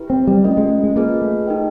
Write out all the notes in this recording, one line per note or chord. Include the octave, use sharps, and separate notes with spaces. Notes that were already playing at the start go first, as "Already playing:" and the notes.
Already playing: E4 G4 B4
C4
G3
A3 C#4 F4 A#4 D#5
G#3
G#3
A#3 F4 G#4 B4 D#5
A3
D#4 G4 A#4 D#5 G5